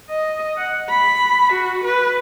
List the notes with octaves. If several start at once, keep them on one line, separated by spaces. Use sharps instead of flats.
D#5
F#5
B5
F#4
B4